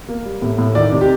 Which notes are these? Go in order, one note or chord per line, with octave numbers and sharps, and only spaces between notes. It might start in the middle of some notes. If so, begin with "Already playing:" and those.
A#3
G3
A2
A2
D#3 D5
C3
G4